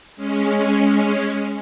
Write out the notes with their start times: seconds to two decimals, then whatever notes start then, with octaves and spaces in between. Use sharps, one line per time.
0.16 G#3 C#4